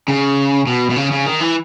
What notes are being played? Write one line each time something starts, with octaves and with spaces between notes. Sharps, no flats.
C#3
B2
B2
C#3
C#3
D#3
E3